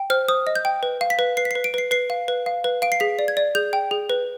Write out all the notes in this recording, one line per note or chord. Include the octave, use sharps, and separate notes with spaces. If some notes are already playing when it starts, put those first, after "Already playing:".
Already playing: G5
C5 F6
C5 D#6
D#5
G6
G5
B4
F5
B6
B4
B4 C7
B6
C7
B4
D7
B4 C7
B4 C7
F5
B4
F5
B4
F5 D7
C7
G#4 B6
D5
G#6
D5
G#4 G6
G5
G#4
B4